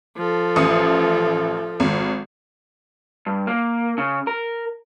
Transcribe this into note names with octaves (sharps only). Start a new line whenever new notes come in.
F3 A4
A1 D#6 C#7
G#1
G2
A#3
C#3
A#4